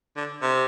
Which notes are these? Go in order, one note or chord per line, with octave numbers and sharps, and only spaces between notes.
D3
C3